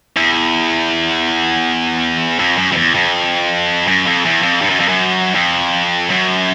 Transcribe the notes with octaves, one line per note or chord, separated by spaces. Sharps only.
E2
F2
F#2
F2
E2
F2
F#2
F2
E2
F2
G2
F#2
F2
F#2
F2
F#2